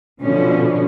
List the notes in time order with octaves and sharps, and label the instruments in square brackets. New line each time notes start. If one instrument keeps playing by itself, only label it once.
[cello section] B2 D3 F3 C#4